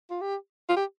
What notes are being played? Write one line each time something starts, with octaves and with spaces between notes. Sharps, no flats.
F4
G4
F4
G4